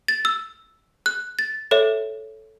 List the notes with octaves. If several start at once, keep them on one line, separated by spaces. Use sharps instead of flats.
A6
E6
F#6
A6
A4 C#5 E5